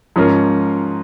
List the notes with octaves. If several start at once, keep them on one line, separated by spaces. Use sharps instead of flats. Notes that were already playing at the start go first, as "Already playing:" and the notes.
G#2 F3 C#4 A#4